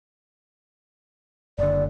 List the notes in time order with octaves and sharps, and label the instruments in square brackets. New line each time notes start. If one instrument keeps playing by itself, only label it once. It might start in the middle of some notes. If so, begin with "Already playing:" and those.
[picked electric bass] F#1 D3 [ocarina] D5